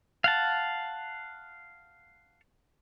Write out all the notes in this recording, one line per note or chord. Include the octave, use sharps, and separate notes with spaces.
F5 F#5 A5